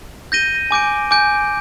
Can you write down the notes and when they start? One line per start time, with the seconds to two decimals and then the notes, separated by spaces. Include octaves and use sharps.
0.32 G6 A#6 D#7 G7
0.71 G#5 D6 G6 D7
1.11 G#5 D6 G6 D7